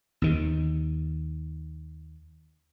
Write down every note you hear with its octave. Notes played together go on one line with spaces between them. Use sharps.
D#2 D#3